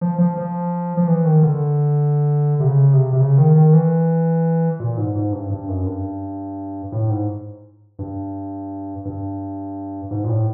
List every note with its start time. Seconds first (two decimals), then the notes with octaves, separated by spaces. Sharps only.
0.01 F3
0.18 F3
0.37 F3
0.97 F3
1.07 E3
1.25 D#3
1.43 D3
2.60 C3
2.67 C#3
2.93 C3
3.13 C3
3.21 C#3
3.38 D#3
3.56 D#3
3.73 E3
4.80 A#2
4.97 G#2
5.15 G#2
5.33 G2
5.50 G2
5.68 F#2
5.86 G2
6.92 A2
7.10 G#2
7.99 G2
9.05 G2
10.11 G#2
10.24 A#2
10.29 A2